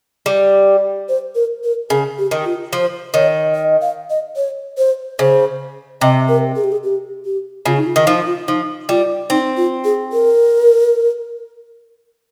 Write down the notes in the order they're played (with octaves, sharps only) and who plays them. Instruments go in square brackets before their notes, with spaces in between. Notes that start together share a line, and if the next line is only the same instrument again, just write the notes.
[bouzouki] G3
[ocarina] C5
A#4
A#4
[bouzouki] C#3 [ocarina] G#4
[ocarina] G4
[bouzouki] D#3
[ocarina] F4
[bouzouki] F3 [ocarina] C5
[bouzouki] D#3 [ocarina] C#5
[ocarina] D#5
F5
D#5
C#5
C5
[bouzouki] C#3 [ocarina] C5
[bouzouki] C3 [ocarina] D#5
[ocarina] A#4
G#4
G4
G#4
G4
G4
[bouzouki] C#3 [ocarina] F4
[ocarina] D#4
F4
[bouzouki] D#3
[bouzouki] F3 [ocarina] D#4
[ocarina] F4
[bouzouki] F3 [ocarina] D#4
[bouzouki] G3 [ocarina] F4
[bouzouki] C4 [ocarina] D#4
[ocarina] F4
G#4
A#4